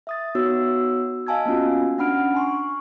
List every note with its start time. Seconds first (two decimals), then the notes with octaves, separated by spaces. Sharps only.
0.07 E5 D#6 A6
0.35 B3 D#4 F#4 C#5 E6
1.27 D#5 F5 G#5 A5 E6 G#6
1.46 A#3 B3 C#4 F4 F#4
1.98 C#4 D4 F#5 B5 F6 D7
2.35 G#5 C6 C#6